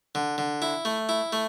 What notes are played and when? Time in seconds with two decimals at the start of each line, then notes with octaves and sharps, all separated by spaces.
0.15 D3
0.38 D3
0.62 E4
0.85 A3
1.09 E4
1.33 A3